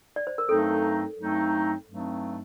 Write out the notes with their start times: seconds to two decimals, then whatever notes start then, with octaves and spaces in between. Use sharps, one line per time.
0.16 D5
0.27 C5
0.38 A#4
0.49 G2 F#3 A3 C4 D#4 A4
1.18 G2 F#3 A3 C4 D#4
1.87 G2 F#3 A3 C4 D#4